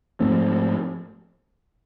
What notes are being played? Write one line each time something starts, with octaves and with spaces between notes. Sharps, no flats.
G#2 F3 A3 C4